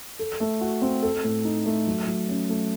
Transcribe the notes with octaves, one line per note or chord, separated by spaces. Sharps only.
A4
A3
F#4
C4
A4
A2
D#4
A3
F#3
F#3
C#4
A3